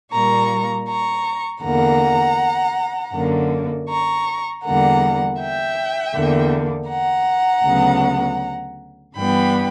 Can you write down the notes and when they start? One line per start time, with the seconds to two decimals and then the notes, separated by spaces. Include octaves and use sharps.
0.12 A#2 G3 A#3 A#5 C#6
0.88 A#5 C#6
1.63 E2 D3 A#3 F#5 A#5
3.13 F#2 D3 A#3
3.88 A#5 C#6
4.64 E2 D3 G3 A#3 F#5 A#5
5.40 E5 G5
6.15 E2 D3 A#3
6.90 F#5 A#5
7.65 D2 C#3 F#3 B3
9.15 G2 E3 G3 B3 G5 B5